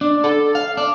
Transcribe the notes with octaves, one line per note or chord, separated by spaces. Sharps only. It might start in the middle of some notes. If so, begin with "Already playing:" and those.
D4
A4
F5
D4